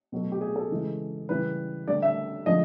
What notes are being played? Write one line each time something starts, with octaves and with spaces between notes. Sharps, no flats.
B2 F#3 A3
G4
G#4
A4
C#3 E3 G#3
C#3 E3 G3 B4
D3 G3 D5
E5
D3 F3 G#3 D#5